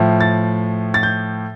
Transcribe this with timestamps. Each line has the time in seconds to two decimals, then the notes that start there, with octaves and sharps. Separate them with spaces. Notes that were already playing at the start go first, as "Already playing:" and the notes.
Already playing: A2 F3
0.20 A6
0.94 A6
1.03 G6